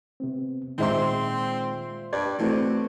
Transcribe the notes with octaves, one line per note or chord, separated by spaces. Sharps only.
C3 B3 C4
A#2 D#3 G#3 C4 C5 E5 C6
G2 D5 G#6
B2 E3 A3 C4